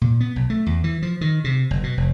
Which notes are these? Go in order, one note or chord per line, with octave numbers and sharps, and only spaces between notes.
A#2
B3
B1
A3
E2
E3
F3
D#3
C3
F#1
B2
F1